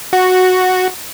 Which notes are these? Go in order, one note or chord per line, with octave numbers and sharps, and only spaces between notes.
F#4